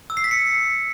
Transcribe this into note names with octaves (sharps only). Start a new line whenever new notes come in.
E6
C7
B6
C#7